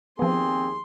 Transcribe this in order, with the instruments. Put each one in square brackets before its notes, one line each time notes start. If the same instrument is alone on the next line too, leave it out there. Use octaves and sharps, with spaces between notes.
[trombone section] D#2 G#4 [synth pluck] F3 B3 [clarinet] C4 [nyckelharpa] C6